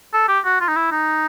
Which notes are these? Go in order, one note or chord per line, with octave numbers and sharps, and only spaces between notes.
A4
G4
F#4
F4
D#4
E4
D#4